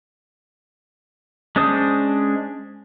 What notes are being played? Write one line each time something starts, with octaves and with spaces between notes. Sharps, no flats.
G#3 C#4 D4 C5 D#6